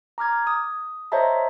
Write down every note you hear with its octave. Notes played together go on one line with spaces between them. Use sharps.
A#5 D6 F6 G#6
D#6
C5 C#5 D#5 E5 A5 A#5